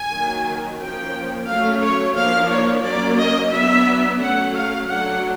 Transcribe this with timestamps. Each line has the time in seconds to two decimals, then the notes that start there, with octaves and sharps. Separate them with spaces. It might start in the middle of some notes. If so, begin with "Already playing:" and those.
Already playing: G#5
0.11 D#3 F#3 A#3
0.79 F3 A#3 C#4 G5
1.47 F#3 A3 C#4 F5
1.81 C#5
2.15 F3 A#3 D4 F5
2.50 C#5
2.83 F#3 A#3 C#4 D5
3.17 D#5
3.51 F#3 B3 D4 E5
4.19 F#3 A3 C#4 F#5
4.54 F5
4.87 F#3 A3 D4 F#5